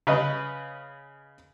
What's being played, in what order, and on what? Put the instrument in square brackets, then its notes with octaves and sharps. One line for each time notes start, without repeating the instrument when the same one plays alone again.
[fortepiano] C#3 B4 D#5